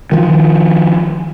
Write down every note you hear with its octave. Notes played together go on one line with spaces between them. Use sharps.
D#3 F3